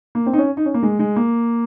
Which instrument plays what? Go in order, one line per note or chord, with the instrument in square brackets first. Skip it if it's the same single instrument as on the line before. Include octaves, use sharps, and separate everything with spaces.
[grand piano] A#3
C4
D#4
C#4
D#4
C#4
A#3
G#3
G#3
A#3